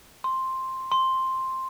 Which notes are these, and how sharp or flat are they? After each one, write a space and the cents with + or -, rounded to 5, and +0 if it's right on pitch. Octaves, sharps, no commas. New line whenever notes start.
C6 +5
C6 +5